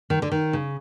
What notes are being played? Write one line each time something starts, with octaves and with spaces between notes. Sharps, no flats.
D#3
D3
D#3
C#3